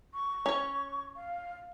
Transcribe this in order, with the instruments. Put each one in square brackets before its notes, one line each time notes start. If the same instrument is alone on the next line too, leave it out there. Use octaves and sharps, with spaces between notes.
[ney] C#6
[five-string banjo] C#4 C#5
[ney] F5